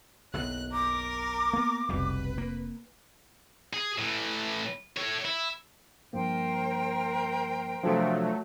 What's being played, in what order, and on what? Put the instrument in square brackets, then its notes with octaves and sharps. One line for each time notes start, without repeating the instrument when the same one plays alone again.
[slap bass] F#1 B1 [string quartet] F#6
[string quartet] A#4 [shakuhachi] D6
[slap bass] A#3 B3
[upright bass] F1 [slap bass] B1 B2 G3 [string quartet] B4
[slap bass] A#3
[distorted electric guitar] G#4
A2 E3
A3 C#5
E4
[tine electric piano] G2 F3 A#3 [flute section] A#4 C5 G5
[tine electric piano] C3 D4 [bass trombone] F3 [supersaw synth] F#3 A3